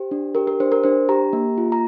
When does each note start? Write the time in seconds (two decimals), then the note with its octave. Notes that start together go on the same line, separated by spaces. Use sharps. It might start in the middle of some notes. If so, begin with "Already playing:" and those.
Already playing: G4 C5
0.11 D4
0.35 G4 A#4
0.47 A#4
0.60 D4 C5
0.72 A#4
0.84 D4 C5
1.09 G4 A#5
1.33 A#3
1.58 F4
1.72 A#5